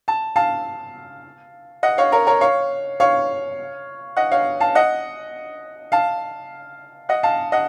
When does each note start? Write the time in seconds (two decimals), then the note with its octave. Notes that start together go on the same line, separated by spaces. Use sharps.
0.08 A5
0.36 F5 A5
1.83 D#5 F#5
1.98 C#5 F5
2.12 A#4 C#5
2.27 A#4 C#5
2.41 C#5 F5
3.00 C#5 F5
4.17 D#5 F#5
4.31 C#5 F5
4.60 F5 A5
4.75 D#5 F#5
5.92 F5 A5
7.09 D#5 F#5
7.23 F5 A5
7.52 D#5 F#5